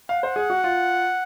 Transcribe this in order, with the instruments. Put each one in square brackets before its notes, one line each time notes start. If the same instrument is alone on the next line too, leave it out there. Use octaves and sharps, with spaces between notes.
[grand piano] F5 [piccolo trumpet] F#5
[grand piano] C5
G#4
F#4
F4